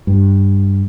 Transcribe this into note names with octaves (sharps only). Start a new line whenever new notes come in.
G2